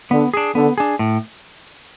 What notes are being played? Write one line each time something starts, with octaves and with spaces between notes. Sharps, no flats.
D3 B3
D4 G#4
D3 B3
D4 G#4
A2